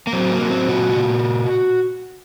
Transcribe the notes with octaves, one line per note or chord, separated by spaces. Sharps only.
A#3
F#3 C4
A#3
F#3
C4
A#2 F#4
A#2